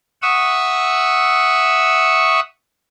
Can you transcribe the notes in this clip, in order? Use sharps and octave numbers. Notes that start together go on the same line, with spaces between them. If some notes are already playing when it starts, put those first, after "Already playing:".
E5 F#5 C#6 D#6 E6